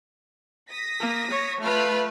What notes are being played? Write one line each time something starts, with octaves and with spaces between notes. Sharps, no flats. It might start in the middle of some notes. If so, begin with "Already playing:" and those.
D#6 A#6 B6
A#3
C#5
A3 F4 B4 B5 F6